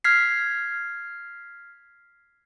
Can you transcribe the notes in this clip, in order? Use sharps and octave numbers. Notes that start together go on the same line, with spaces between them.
F6 G#6 B6 C7